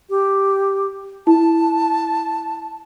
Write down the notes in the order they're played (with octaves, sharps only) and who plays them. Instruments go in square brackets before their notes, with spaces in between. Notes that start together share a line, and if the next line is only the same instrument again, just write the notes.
[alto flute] G4
[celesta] E4 [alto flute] A5